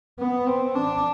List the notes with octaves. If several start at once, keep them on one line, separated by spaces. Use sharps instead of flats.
B3
C4
D4